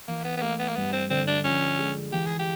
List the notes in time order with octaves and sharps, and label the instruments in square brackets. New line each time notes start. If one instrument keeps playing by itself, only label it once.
[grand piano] E3 [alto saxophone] A#3
[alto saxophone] B3
B3
[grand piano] A3 [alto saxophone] A#3
[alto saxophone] B3
A#3
[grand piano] G2 [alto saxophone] B3
[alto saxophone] C4
[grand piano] D3 [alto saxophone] C4
[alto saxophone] D4
[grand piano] F3 [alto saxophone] C#4
[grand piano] G#3
[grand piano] E3 [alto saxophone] G4
[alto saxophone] G#4
G4